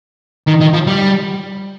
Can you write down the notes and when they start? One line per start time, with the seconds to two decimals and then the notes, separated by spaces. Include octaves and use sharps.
0.47 D#3
0.61 D#3
0.74 F3
0.87 G3